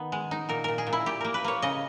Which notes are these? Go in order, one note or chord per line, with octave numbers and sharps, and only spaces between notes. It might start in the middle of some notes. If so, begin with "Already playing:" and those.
Already playing: D#3 B3 D#4
G#3
D#4
A#2 A#4
A#2 A#4
G#4
A#2
E4
A#2 G4
A#3 A#4
B4
A#3 C#5
C#3 D#5